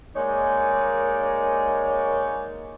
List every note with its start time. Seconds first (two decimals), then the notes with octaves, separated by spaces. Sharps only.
0.15 G#3 A#3 D#4 C#5 D5